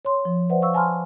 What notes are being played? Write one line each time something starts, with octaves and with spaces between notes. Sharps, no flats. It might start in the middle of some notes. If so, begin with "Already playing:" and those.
C#5 C6
F3
B4 C5 D5 E5 F#5
F5 C#6 E6
G#5 A5 B5 C6 F6